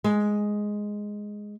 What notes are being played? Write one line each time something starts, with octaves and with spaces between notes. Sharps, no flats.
G#3